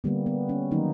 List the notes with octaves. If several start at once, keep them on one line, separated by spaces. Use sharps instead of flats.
D3 G3 A#3 B3
B3
C#4
D#3 F#3 A#3 D#4